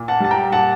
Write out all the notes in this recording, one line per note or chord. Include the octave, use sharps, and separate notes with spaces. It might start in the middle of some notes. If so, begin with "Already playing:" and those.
Already playing: A#2
F#5 A5
G3 A5
G5 A#5
A#2 F#5 A5